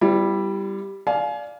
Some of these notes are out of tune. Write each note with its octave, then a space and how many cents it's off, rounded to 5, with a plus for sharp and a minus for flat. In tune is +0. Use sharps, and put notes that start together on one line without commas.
G3 +0 B3 +40 E4 +35
D5 +0 F5 +0 G#5 +30